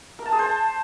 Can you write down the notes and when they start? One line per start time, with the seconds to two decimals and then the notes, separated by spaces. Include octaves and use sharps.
0.19 A#4
0.26 A5
0.32 G#4
0.39 C5
0.46 A5